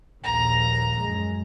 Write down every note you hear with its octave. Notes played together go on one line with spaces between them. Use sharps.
A#1 D#2 A#5
F#2 G#3